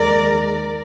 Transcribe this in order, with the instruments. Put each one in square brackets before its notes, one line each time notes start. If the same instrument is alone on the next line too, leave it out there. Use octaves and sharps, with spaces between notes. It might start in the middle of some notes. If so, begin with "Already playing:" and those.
Already playing: [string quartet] D#2 D#3 G#3 A#4 D5